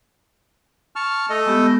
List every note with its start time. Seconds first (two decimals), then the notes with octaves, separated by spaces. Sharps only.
0.96 A5 C#6 F6
1.30 A3 A4 D#5
1.46 G#3 B3 G4